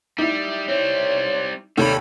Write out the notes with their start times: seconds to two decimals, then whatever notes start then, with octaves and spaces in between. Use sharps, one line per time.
0.18 G3 D#4 E4
0.68 G3 C4 C#5
1.77 D#2 C3 D#3 G3 A4 C#5 B5